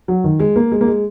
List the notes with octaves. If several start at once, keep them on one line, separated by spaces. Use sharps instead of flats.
F#3
D#3
G#3
A#3
G#3
A#3
G#3